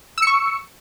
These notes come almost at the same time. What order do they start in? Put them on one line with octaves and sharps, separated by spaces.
E6 C#7 C#6